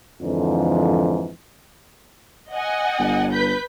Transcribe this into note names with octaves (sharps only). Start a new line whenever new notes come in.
F2 G#2 D3 E3 F3
D#5 F#5 G#5
G1
B4 G6 B6